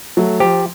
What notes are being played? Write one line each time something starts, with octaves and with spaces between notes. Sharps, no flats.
F#3 A3
F3 G4